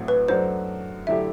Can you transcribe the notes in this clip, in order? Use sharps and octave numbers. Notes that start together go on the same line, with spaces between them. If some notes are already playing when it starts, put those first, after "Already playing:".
Already playing: A1 A2 F#3 C4
B4
F#2 F#3 A3 D4 F#4 C5
F#2 D3 A3 E4 G4 E5